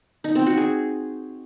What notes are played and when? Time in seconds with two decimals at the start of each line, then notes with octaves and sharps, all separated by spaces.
0.24 D#4
0.35 C4
0.46 F#4
0.58 G#4